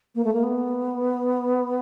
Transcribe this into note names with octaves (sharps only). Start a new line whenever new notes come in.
A#3
A3
A#3
B3